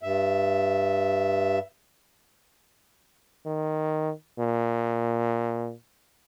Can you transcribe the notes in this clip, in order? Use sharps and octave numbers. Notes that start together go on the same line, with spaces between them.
G2 E5
D#3
A#2